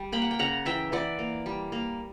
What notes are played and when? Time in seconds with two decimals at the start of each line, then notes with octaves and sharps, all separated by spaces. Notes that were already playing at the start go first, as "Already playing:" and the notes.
Already playing: G3
0.12 A#3 G5 B5
0.22 F#5
0.31 G5
0.39 C#3 F#5 A#5
0.65 E3 E5 G5
0.92 E3 D5 F#5
1.19 A#3
1.46 G3
1.72 A#3